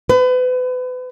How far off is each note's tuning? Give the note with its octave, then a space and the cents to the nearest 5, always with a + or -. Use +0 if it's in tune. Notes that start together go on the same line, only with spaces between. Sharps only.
B4 +35